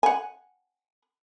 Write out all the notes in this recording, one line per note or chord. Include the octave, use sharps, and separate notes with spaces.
F#5 G#5